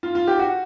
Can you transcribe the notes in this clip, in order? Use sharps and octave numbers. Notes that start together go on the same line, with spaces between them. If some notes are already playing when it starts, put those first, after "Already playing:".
F4
F4
G4
F#4